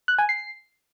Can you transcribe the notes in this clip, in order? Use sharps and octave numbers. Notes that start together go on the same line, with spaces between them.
F#6
G#5
C7